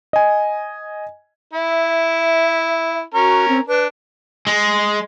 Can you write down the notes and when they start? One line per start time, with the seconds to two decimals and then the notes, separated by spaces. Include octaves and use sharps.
0.13 D#5 G#5
1.53 E4 E5
3.14 C#4 F#4 A#4
3.48 C4
3.68 D4 B4
4.47 G#3